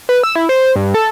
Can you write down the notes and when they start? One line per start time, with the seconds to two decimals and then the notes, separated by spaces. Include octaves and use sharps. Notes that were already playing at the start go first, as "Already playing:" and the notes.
0.09 B4
0.23 E6
0.35 E4
0.49 C5
0.76 G2
0.94 A4